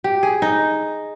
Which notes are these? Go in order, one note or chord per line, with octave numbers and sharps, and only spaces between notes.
G4
G#4
D#4